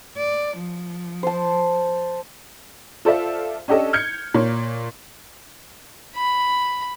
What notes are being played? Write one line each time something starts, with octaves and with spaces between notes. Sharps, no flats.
D5
F3
C5 A5
F4 A4 C5 D5 E5 F5
C#4 D4 G4 A4 D#5
F6 G6 G#6 C#7
A#2 C#5
B5